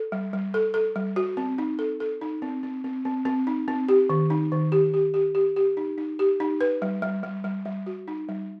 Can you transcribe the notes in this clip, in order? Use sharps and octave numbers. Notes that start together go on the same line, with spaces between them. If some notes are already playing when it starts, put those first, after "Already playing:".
Already playing: A4
G3
G3
A4
A4
G3
F#4
C4
D#4
A4
A4
D#4
C4
C4
C4
C4
C4
D#4
C4
G4
D#3
D#4
D#3
G4
G4
G4
G4
G4
D#4
D#4
G4
D#4
B4
G3
G3
G3
G3
G3
F#4
D#4
G3